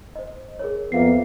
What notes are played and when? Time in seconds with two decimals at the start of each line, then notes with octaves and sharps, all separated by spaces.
0.16 C5 D#5
0.59 G#4 A#4 C#5
0.92 F2 A#3 B3 E5 F5 C7